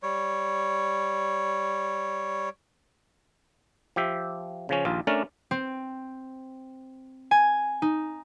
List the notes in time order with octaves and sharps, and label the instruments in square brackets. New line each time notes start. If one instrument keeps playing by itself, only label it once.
[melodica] G3 C#5
[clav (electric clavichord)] F3 G4 E5
C#3 F3 C#4
A#1 D#2 F4
A3 C#4 D4 A#4 D5
[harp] C4
G#5
D#4